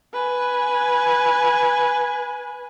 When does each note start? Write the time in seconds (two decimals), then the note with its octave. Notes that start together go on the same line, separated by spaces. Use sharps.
0.13 B4 G#5